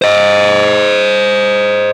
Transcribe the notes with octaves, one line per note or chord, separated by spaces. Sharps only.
C5 D#5